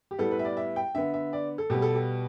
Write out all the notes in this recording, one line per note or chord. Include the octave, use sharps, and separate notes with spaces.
G4
A2 G3 B3 A4
B4
E5
D5
E5
G5
D3 B3 E5
E5
D5
A4
B2 G3 B3 G4
A4
G4